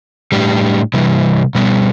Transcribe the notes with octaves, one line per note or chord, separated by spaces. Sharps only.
A2 G3 D4 G4
C3 E3 G3
B2 G3 B3